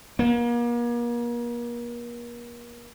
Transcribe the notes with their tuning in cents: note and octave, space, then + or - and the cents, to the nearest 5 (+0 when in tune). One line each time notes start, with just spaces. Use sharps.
A#3 +40